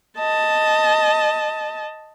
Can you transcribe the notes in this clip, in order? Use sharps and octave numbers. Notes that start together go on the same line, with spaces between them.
D#5 A5